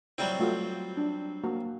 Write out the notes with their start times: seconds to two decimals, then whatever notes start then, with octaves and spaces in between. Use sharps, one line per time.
0.18 F#3 G3 C4 E4
0.40 A3 F4 F#4
0.97 D4
1.44 A#3 F#4